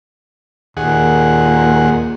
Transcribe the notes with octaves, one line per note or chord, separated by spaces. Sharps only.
D#2 A#2 G#4 F#5